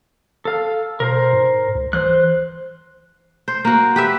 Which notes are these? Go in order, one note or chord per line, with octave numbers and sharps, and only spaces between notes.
A4 F5
B2 A#4 C5
G#2
C#2
E3 C5 F#6
C5
A#3 F#4
G4 B4 E5